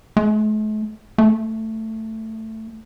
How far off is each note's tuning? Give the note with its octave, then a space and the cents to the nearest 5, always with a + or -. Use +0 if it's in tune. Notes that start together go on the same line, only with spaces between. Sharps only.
A3 -45
A3 +10